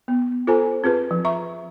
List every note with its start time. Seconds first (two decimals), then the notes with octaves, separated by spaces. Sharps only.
0.08 B3
0.47 F4 A4 C5 G#5 A#5
0.84 C4 F4 G#4 B4
1.11 F3
1.25 E5 A#5 C#6